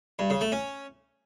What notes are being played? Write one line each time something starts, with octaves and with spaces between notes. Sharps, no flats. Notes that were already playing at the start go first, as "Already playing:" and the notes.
G2
C#3
A3
C#4